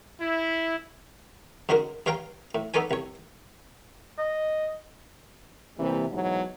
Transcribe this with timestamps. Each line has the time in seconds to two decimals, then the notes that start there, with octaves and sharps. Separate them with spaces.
0.21 E4
1.69 G#2 D3 G#3 C#4 F#4 A#4
2.06 G2 C#5 F5 G5 A#5
2.55 A2
2.74 B3 D#4 A4 C#5 D5 G#5
2.91 C2 C#5
4.18 D#5
5.77 C3 E3 G3 A#3
6.10 G#2 B2 E3 F#3